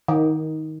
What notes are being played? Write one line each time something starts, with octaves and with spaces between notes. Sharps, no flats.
D#3